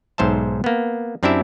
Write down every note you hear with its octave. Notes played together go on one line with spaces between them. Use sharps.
B1 G#2 C5 E5 A5
A#3 B3
F#2 C4 D4 E4 G4 E5